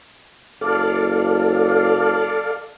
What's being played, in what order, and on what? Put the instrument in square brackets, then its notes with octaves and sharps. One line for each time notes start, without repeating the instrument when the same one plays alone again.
[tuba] F#1 [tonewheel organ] A4 D5 F5